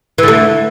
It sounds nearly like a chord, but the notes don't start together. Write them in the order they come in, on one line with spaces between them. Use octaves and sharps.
E3 D3 A3